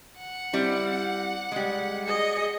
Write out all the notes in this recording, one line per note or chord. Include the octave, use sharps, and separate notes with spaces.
F#5
G3 C4 E4
G3 G#3
G#4 D#5 C#7